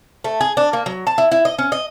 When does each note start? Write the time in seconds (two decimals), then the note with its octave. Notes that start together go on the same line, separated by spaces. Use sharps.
0.24 A3
0.41 G#4
0.57 D4
0.73 A#3
0.86 F#3
1.07 A5
1.18 E4
1.32 E4
1.45 D#5
1.58 C#4
1.72 D#5